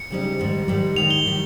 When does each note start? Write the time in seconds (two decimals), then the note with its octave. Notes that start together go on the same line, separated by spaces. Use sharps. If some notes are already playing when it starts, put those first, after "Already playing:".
Already playing: C#7
0.10 C#3 G3 C4 D#4
0.39 G#2 D#3 G3
0.68 G#2 D#3 G3
0.96 G#2 D#3 G3 F7
1.10 G7
1.26 D#3 G3